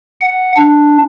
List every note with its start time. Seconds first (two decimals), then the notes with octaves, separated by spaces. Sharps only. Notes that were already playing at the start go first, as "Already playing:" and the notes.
0.21 F#5
0.57 D4